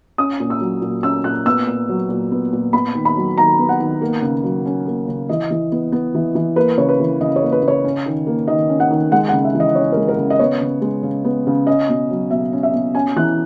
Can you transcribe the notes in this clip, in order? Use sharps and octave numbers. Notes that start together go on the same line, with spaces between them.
C#4 D#6
A#2
E6
F#3
A#2
C#4 E6
A#2 F#6
B3 E6
A#2
F#3
A#2
B3
A#2
B3 B5
D#3
B5
F#3
D#3 A#5
B3
F#5
D#3
A#3
C#3
F#3
C#4
A#3
C#3
E3 D#5
E3
B3
B3
E3
E3
A#3 B4
C#3 C#5
B4
E3
C#3 D#5
C#5
A#3
B4
C#3
C#5
C#4
D#3
A#3
D#3 D#5
C#4
F#5
D#3
G#3 F#5
F#5
C#3
E5
E3
D#5
C#4 C#5
A#4
G#3
A#4
C#3
D#5
B3 C#5
C#3
G#3
C#3
B3
C#3
C#4 D#5
B2
F#3
B2 E5
C#4
E5
B2
C#4 G#5
E3 F#6